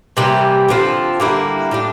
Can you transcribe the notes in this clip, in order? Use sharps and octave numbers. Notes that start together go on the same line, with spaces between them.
C3 E3 G3 A#3
D3 F3 C4
D3 G3 A#3 E4
A2 G3 D4